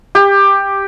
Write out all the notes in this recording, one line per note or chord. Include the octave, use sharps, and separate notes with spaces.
G4